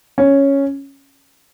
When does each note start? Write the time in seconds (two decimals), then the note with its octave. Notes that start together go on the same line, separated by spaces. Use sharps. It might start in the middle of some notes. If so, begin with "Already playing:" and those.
0.18 C#4